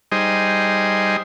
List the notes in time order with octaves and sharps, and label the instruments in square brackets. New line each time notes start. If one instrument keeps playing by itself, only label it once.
[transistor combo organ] G3 D#4 G#4 C5 D#5